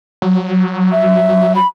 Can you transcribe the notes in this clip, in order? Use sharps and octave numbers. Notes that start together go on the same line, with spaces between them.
F#3
E5
B5